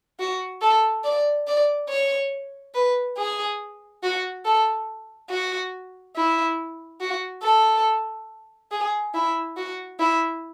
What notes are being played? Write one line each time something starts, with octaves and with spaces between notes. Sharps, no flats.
F#4
A4
D5
D5
C#5
B4
G#4
F#4
A4
F#4
E4
F#4
A4
G#4
E4
F#4
E4